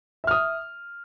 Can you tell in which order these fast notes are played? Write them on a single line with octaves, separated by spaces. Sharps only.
E5 F6 D#6